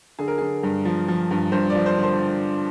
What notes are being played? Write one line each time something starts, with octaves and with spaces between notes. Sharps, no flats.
D3 G#4
A#4
D3 G#4
G2
F3
F3
G2
G2 C5
D5
F3
C5
D3
C5